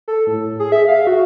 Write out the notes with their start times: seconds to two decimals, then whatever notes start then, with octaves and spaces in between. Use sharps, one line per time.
0.08 A4
0.27 A2
0.59 G#4
0.72 E5
0.88 F5
1.07 F#4